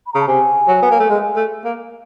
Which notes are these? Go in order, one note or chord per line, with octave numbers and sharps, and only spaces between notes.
B5
C#3 A#5
A5
C3 G#5
F#3
B3
A#3
A3
G#3
A3
A#3